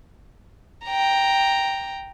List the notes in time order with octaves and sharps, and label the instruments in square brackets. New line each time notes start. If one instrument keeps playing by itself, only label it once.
[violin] G5 A#5